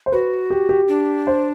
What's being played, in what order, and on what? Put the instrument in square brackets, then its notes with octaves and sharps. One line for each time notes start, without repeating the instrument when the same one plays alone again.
[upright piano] C5
[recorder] F#4 [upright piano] B4
[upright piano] G4
G4
[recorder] D4
[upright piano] C5